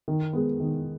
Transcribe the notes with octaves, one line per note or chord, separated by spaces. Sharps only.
D#3
G#3 B3
D#3